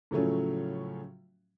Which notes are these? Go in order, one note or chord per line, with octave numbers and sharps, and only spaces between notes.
A2 C#3 F3 F#3 A3 C#4